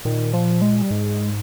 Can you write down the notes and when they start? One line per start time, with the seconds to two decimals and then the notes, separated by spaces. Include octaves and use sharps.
0.05 A#2 D#3
0.33 F3
0.62 G#3
0.82 G3
0.91 G#2 G#3